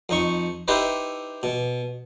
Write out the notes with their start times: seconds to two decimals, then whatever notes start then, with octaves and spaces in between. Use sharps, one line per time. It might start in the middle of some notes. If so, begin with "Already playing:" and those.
0.09 F2 D#4 C#6
0.68 D#4 E4 G4 B4 C5 D#5
1.43 B2